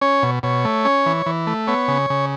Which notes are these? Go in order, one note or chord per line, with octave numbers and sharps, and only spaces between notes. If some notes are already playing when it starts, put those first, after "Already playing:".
C#4 C#5
B2
B2 C#5
A3
C#4
E3
E3
A3
B3 C#5
C#3
C#3